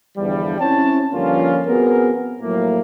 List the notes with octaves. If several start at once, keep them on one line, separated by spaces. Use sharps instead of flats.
E2 G2 D3 F3 G3
C4 C#4 E4 C5 C#5 A5
G2 D3 F3 A#3 C#4 F4
B3 C4 F#4 G#4 A#4
A2 F3 F#3 A3 A#3